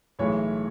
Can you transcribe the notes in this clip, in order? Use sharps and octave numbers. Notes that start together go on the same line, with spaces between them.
B1 A2 E3 G#3 C#5